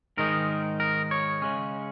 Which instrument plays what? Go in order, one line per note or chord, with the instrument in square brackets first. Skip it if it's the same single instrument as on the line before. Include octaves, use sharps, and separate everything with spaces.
[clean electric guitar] G#2 D#3 G#3 D#4 A#4
A#4
C#5
C#3 G#3 C#4